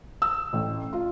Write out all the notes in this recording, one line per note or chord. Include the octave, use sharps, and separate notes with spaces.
E6
A1
F4